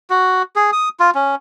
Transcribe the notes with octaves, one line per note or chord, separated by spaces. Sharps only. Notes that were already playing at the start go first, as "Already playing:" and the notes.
F#4
G#4
D#6
F4
C#4